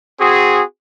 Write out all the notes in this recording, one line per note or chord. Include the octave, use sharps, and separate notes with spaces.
C4 F#4 G#4